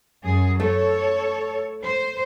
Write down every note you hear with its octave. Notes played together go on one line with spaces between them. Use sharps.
F#2 G#4
A3 A4 C#5
C5